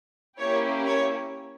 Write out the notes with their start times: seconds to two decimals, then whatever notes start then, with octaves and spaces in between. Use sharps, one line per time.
0.39 A#3 C#4 E4 G4 C#5
0.85 C#5